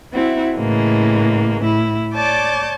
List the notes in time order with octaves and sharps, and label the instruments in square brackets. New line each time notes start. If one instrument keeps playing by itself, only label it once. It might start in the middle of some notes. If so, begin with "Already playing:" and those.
[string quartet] C4 E4 F#4 E5 F#5
A2 C#3 E3 G#3 A#3
A2 E4
C#5 D5 A5 D6 G6